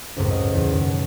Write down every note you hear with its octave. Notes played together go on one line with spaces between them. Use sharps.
G#1 C#2 F#2 A2
D#5
E2 G6 D#7
F#2 D#3
B2